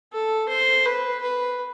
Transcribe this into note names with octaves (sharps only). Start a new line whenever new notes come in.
A4
C5
B4
B4